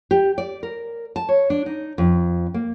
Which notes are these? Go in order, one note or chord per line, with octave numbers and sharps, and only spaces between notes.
G4
D5
A#4
A5
C#5
D4
D#4
F2
A#3